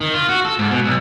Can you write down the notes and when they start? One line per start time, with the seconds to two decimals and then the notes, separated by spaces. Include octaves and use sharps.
0.01 D#3
0.14 F4
0.29 F#4
0.45 A4
0.59 G#2
0.71 B2
0.84 B1